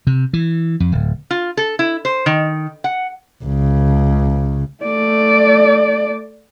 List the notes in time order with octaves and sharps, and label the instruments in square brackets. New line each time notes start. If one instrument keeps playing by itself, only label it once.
[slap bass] C3
E3
F2
D1
[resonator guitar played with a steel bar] F4
A4
E4
C5
D#3
F#5
[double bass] C#2 C#3
[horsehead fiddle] A3 D5